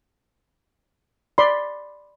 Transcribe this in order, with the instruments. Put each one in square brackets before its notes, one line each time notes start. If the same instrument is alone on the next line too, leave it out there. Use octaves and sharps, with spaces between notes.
[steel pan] D5 B5 C6